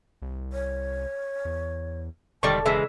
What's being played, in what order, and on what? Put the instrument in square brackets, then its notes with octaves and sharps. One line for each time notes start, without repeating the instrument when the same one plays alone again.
[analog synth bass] C2
[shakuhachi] C#5
[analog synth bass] E2
[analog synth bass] E1 [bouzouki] D3 D#3 G3 [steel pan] D5 C#6 [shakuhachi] A5
[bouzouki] C#3 E3 G#3 [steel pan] E5